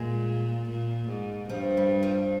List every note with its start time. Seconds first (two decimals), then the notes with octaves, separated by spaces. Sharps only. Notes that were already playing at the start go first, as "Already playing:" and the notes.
Already playing: A#2 G#3
0.70 A#2
1.09 G#2
1.50 G2 F3
1.77 G3
2.03 F3